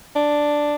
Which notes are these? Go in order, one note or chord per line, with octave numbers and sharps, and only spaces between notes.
D4